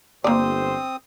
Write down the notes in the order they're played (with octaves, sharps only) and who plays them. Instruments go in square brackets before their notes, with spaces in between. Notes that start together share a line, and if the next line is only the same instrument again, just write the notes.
[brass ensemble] G1 C5 [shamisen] A#3 D5 [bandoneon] C4 D#6